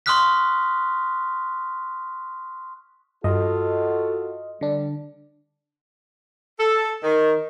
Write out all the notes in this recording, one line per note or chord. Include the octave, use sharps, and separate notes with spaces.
C6 C#6 D#6 F6 F#6 B6
G2 F4 F#4 A4 D#5
D3 G3 D4
A4
D#3